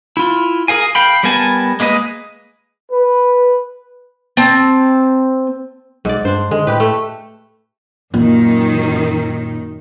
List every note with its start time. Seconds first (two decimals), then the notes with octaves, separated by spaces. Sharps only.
0.17 E4 F4
0.68 G#4 A#4 F5 G#5
0.95 F5 G5 B5
1.23 G3 B3 A#4 G#5 A5
1.80 G#3 A#3 B4 D#5
2.92 B4
4.37 C4 A5
6.05 B1 G#2 D5
6.25 G2 D4 C5
6.51 D3 G#3
6.67 A2 G4 B4
6.80 A3
8.14 F#2 A#2 D#3 A#3